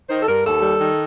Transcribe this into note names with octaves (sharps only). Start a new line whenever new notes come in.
D#3 C5
A4
G2 A#4
D#2 A4
G3
D#3